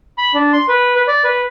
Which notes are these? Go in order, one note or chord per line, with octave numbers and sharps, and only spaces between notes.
B5
D4
C6
B4
B4
D5
B4